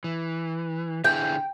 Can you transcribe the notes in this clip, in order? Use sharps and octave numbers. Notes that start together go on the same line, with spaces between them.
E3
D3 E4 G#4 G5